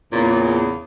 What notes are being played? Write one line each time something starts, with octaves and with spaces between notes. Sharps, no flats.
E2 A#2 C#3